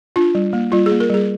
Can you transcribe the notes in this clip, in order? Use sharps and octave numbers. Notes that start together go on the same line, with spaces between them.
D4 F4
G3
A#3
G3 F4
G#4
A#3
A#4
G3 G#4